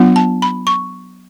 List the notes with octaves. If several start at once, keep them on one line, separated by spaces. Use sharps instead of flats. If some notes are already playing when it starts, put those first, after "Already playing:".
Already playing: F#3 B3 D4 F4
A5
B5
C#6